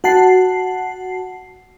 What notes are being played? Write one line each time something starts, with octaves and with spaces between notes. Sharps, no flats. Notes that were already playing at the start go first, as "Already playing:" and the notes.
F#4 F#5 A5 C7